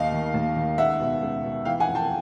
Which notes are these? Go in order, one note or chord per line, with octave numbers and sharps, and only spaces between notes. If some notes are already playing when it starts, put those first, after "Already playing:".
Already playing: D#2 D#5 F5
D#3
D#2
D#3
C#2 E5 F#5
B2
C#2
B2
E3 F5 G5
F#5 G#5
F2
G5 A5